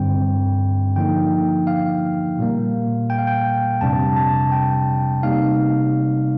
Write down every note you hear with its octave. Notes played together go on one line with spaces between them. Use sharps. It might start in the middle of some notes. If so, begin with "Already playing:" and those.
Already playing: G2 D3 G3 C4 G5
D3 F3 A#3 D#4 G5
F5
A#2 G3 A#3
G5
F5
G5
F2 C3 G3 D4 A5
A5
G5
C3 G3 A#3 D#4 F5